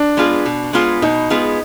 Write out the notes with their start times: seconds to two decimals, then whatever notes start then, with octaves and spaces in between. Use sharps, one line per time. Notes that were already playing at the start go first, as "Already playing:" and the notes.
Already playing: D4
0.17 G#3 B3 F4 G#4
0.46 B2
0.73 G#3 B3 F4 G#4
1.02 B2 D#4
1.30 G#3 B3 F4 G#4